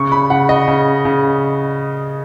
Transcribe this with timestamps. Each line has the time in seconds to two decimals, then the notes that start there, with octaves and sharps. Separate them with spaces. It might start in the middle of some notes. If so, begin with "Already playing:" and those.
Already playing: C#3 C#6
0.12 B5
0.30 C#3 F#5
0.49 D#5
0.68 C#3
1.05 C#3